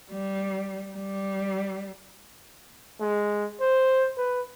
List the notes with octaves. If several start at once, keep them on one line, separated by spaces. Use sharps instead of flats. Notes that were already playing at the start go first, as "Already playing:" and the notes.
G3
G3
G#3
C5
B4